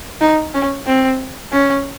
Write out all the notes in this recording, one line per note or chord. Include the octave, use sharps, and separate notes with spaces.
D#4
C#4
C4
C#4